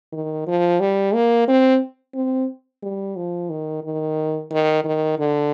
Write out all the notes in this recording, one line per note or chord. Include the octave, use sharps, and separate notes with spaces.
D#3
F3
G3
A#3
C4
C4
G3
F3
D#3
D#3
D#3
D#3
D3